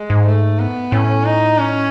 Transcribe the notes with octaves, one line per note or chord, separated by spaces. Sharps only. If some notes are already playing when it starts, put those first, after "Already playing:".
Already playing: G#3
G#2
A3
B3
A2 C#4
D#4
C#4